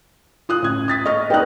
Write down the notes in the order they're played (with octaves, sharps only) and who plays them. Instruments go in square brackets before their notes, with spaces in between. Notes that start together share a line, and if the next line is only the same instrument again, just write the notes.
[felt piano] F4 D#6 F#6
A1 G#6
D#6 A6 B6
[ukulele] D#5 [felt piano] C#6 F6 A#6
[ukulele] D#4 G4 [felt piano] B4 D5 F#6